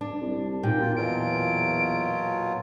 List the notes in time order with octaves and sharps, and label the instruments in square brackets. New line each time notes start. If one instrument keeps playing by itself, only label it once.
[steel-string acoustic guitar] D4
[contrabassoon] C2
[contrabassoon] D#2 [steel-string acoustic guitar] A#2 [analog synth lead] G5
[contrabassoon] B2 [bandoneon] F4
[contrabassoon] E2 [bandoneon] B2 F#3 F4 [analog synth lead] D7